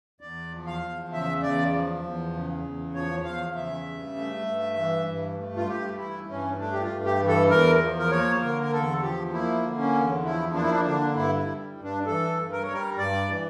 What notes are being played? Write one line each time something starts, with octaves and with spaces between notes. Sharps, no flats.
E2 D5
F3
F5
E2
C#3 E5
E2 D5
F3
E2
C#3
E2
F3 C#5
E2 F5
C#3 E5
G2
A3
G2
E3
G2
A3
F4
G2 G4
E3 E4
G2 C#4
A3 D4
G4
F4
G2
G4
E3
A4
E2 A#4
F3
A#4
A#3 C#5
D3 A#4
A#4
E2 A4
F3 G4
A#3 E4
D3
C#4
E2
F3 E4
A#3 D4
E4
D4
D3 D4
G2 E4
E4
G3
G2
D4
E3 A4
G2
A#4
G3 C#5
A#4
G2 D5
E3